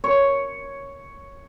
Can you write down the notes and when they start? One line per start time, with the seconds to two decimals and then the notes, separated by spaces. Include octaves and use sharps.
0.04 C#5